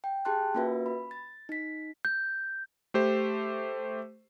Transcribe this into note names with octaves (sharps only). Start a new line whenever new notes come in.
G5
G4 G#4 G5 A5 C6 F#6
A#3 C#4 F4 F#4 B4 E5
B5
A6
D#4 B6
G6
A3 G4 C5